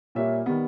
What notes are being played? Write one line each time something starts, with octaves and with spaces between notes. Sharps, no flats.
A#2 G3 A#3 C#5 E5
D#3 G3 B3